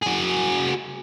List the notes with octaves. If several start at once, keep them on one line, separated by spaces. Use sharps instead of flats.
F#4 G#4